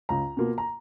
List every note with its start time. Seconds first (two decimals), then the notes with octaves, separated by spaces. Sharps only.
0.09 C#2 A#5
0.37 B2 A#3 F4
0.58 A#5